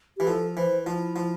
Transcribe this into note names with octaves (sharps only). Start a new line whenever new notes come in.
E3 G4
F3 A4
E3 C5
F3 E4
F3